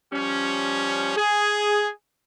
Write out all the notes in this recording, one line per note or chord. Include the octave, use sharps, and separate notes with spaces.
F3 G3 C#4
G#4